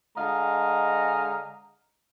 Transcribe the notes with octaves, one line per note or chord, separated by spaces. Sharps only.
D3 G#3 D#5 F5 A#5